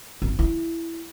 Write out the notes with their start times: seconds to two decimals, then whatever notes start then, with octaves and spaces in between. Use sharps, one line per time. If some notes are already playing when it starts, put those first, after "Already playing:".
0.22 G#1
0.39 E4